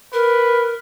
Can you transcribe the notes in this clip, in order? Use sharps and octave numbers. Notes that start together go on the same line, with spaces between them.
A#4 B4